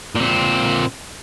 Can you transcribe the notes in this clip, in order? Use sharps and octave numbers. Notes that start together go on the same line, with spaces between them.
A#2 C4